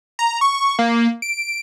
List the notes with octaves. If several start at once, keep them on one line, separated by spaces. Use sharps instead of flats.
A#5
C#6
A#3
D7